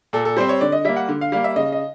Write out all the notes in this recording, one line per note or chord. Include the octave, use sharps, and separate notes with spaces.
A#2 A4
A4
G3 C4 C5
C#5
D3 D5
D#5
G3 A#3 E5
F#5
D3
F5
G3 A#3 F5
E5
C#3 D#5
D#5